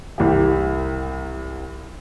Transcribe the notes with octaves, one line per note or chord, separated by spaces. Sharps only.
C2 G4